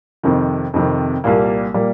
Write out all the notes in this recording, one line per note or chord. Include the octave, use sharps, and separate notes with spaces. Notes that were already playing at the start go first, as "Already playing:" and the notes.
F2 C3 D#3
F2 C3 D#3
C2 A#2 G3 A#3
A#2 G3 A#3